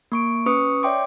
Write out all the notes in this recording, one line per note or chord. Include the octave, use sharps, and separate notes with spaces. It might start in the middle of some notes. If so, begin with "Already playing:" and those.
A#3 C#6 D7
C#4 B4 C#6 D#6 C#7
C#5 D5 E5 G5 C6 D6